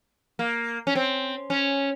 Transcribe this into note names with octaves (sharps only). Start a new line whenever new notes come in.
A#3
C#4
C4
C#4